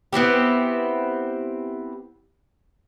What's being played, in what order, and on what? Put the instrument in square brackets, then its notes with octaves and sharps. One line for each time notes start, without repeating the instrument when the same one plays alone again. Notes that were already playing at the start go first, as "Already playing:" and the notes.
[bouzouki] B3 C4 E4 G4